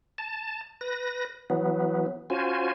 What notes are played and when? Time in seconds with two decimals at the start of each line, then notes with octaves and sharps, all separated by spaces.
0.18 A5
0.81 B4 A#6
1.50 E3 F#3 B3
2.30 C#4 F4 F#4 C5 G#5